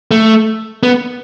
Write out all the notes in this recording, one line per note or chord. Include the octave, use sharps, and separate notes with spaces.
A3
B3